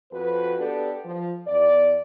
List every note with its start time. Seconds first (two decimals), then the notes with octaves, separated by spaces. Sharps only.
0.11 F2 F#4 B4
0.58 B3 D4 G4 A4
1.04 F3
1.45 E2 D5